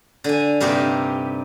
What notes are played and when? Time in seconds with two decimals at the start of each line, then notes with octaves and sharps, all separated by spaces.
0.24 D3 G#5
0.60 G2 C3 A#3 C4 D#4 G4